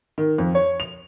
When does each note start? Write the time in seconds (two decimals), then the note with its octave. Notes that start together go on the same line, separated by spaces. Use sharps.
0.18 D#3
0.38 F2
0.55 C#5
0.80 F7